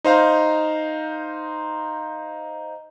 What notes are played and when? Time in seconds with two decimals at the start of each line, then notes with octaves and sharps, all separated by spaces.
0.04 D#4 C5 F5 A#5